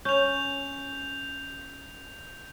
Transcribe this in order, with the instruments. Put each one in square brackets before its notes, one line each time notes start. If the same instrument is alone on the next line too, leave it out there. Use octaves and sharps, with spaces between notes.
[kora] C#4 [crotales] G6 F7